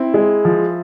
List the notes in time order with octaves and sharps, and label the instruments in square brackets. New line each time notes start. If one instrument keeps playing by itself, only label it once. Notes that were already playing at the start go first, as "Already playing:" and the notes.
Already playing: [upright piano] C4 [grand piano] E4
[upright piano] G#3
F3